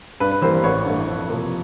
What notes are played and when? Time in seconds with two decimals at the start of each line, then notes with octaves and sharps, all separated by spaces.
0.20 G2 B4
0.32 B4
0.42 E3 G3 A#3 C5
0.63 A1 B4 C#5
0.85 G2 E3 A3
1.07 F2
1.28 C3 F3 A#3